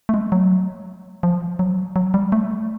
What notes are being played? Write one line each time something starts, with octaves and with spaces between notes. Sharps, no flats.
A3
G#3
F#3
F3
F#3
F#3
G3
A3